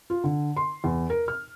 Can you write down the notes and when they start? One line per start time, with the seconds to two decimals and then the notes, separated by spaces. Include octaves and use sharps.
0.10 F4
0.24 D3
0.57 C6
0.84 E2
1.10 A#4
1.28 F6